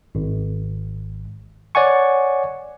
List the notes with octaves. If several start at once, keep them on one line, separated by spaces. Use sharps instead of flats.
G#1
C#5 D5 F#5 G#5 C#6